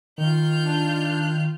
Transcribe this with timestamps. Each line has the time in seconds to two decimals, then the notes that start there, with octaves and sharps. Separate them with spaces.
0.18 D#3 F4 F6 G6
0.64 D4